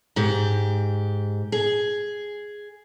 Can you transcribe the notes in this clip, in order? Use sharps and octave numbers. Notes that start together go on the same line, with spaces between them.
G#2 G4
G#4